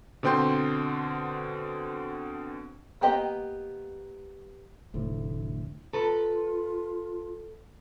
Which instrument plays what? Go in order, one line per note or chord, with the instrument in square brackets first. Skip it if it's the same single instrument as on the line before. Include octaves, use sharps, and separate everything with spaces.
[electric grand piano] B2 D3 C4 G5 C6 G6
[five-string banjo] A#3 B3 G4 D#5
[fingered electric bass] F1 D2 A2
[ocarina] F4 [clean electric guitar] A4 B4